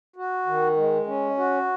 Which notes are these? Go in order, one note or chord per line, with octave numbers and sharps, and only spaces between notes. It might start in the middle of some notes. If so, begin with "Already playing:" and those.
F#4
D#3
G#3
C#4
F#4